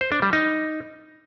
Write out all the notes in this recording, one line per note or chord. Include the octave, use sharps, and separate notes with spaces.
C5
D4
G3
D#4